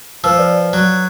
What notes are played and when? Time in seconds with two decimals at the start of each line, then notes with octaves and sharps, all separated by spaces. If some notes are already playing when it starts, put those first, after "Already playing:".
0.24 F3 B4 E6
0.38 B4 D5
0.73 F#3